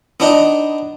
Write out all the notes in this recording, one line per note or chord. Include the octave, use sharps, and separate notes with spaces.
B3 D4 D#4